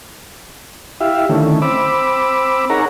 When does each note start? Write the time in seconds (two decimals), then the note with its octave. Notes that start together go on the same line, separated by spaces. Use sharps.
1.01 E4 G4 E5 F5
1.29 D3 D#3 A3 C#4 E4
1.62 C4 B5 D6 E6
2.70 D#4 G#4 A#4 C#5 F#5 A#5